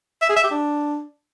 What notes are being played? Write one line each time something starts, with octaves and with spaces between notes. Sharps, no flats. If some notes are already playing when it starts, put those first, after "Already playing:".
E5
G#4
E5
G4
D4